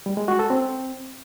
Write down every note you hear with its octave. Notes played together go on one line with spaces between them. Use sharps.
G3
G#3
F#4
A4
C4